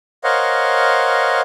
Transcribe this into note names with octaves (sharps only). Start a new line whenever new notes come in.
A#4 C5 C#5 D#5 F5 F#5